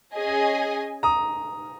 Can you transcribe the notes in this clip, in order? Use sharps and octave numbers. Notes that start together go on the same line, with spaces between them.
C#4 G#4 D#5 G#5
A#5 D#6